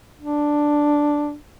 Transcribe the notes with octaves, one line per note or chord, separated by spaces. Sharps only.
D4